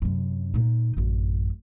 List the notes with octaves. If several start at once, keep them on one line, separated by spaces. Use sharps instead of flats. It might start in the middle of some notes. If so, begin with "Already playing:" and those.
F#2 C3
A#2 D#4
A1 F#2